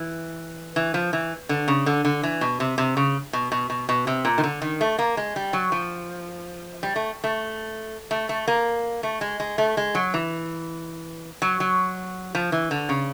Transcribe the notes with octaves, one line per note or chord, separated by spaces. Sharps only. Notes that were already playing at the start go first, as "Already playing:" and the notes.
Already playing: E3
E3
F3
E3
D3
C#3
D3
D3
E3
B2
C3
C3
C#3
B2
B2
B2
B2
C3
A#2
D#3
D3
D#3
A3
A#3
G#3
G3
F#3
F3
G3
A3
A3
A3
A3
A#3
A3
G#3
G#3
A3
G#3
F#3
E3
F#3
F#3
F3
E3
D3
C#3